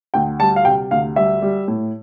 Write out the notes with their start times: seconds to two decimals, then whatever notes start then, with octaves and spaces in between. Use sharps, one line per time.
0.14 D2 G5
0.40 G3 A5
0.56 F5
0.65 C3 G5
0.91 D2 F5
1.16 G3 E5
1.42 G3
1.68 A2